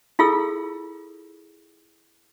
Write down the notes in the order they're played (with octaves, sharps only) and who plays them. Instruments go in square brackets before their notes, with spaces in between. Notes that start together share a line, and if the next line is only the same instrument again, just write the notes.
[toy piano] E4 F4 G#4 A4 E6